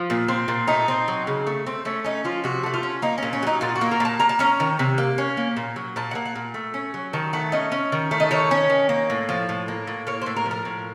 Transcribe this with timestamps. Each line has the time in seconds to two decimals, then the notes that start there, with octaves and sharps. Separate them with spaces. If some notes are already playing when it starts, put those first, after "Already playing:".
Already playing: F3 F4
0.10 A#2
0.28 C4
0.48 A#2
0.68 A3 D#4
0.88 C4
1.08 F#3
1.27 C#3
1.47 A3
1.66 C4
1.85 A3 C#4
2.04 C#4 D#4
2.24 F3 F4
2.44 C3 F#4
2.63 A3 F#4
2.74 F4
2.83 C#4
3.02 A#3 D#4
3.18 A#2 C#4
3.33 C#4
3.43 F#3 D#4
3.61 A#2 F4
3.76 F#4
3.81 A#3
3.91 A#4
4.00 A#2 A5
4.20 A#3 A#5
4.29 A5
4.39 C#4 A#5
4.60 D#3
4.79 C3
4.98 A#3
5.18 C#4
5.37 A#3
5.57 A#2
5.76 F#3
5.96 A#2 A5
6.11 A#3 F#5
6.26 F#5
6.35 A#2
6.54 A3
6.74 C#4
6.94 F#3
7.13 D#3 A5
7.33 A3 F#5
7.52 C#4 D#5
7.72 C#4
7.92 D#3
8.11 A3
8.20 D#5
8.31 D#3 C#5
8.51 C#4
8.70 D#3
8.89 A#3
9.10 A2
9.29 F3
9.49 A2
9.68 A#3
9.87 A2
10.07 A#3 C#5
10.21 A2 C5
10.37 A#4
10.45 F3
10.51 A#4
10.65 A2